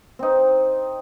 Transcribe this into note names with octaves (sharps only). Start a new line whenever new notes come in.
C4 D#4